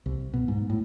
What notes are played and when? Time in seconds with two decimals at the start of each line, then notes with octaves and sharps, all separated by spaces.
0.06 C2
0.34 B2
0.48 G#2
0.70 A2